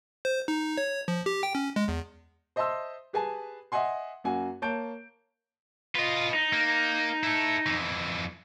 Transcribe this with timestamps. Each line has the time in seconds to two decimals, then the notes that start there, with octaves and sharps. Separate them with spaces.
0.25 C5
0.48 D#4
0.78 C#5
1.08 F3
1.26 G4
1.43 G5
1.55 C#4
1.76 G#3
1.88 E2
2.56 C5 D#5 E5 A5 C6 E6
3.13 G4 G#4 B4 G#5 A5
3.72 D#5 E5 F#5 G#5 C6
4.24 F#2 A#3 F#4 G#5
4.62 A#3 C#5 A5 G6 D7
5.95 F4 B4 D#5
6.34 D#4
6.53 A#3
7.23 E4 A4
7.66 F2 E3